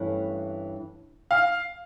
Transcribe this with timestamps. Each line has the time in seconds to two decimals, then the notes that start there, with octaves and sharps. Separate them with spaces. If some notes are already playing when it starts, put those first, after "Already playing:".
Already playing: G2 E3 A3 C#4
1.31 F5